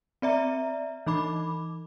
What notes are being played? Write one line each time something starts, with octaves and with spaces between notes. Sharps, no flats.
C4 D5 E5 A#5
E3 D#4 B5 D6